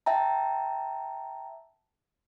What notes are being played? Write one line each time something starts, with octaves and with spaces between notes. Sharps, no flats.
E5 G5 A5 A#5